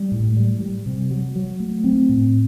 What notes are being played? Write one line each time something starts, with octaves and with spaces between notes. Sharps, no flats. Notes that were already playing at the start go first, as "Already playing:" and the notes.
Already playing: G3
A2
G3
G3
C3
F#3
F#3
A3
C4
A2